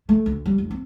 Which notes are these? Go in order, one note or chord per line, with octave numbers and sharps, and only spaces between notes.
A3
D2
G3
F1
C4